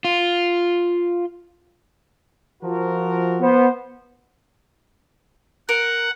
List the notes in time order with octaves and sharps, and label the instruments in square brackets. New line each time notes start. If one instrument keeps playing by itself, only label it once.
[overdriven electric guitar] F4
[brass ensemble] F3 F#4 A#4
[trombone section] B3 C5
[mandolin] A#4 [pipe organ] F#5